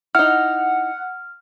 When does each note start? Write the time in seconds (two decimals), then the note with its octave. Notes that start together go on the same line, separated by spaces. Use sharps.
0.15 D#4 E4 F#5 F6